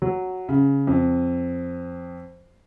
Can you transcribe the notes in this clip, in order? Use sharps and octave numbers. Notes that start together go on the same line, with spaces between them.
F#3
C#3
F2